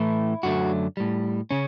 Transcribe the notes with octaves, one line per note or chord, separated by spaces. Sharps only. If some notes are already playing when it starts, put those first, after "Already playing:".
Already playing: A2 E3 A3 E4
F#2 D3 F#3 A3 F#4
A2 G3
C#3 C#4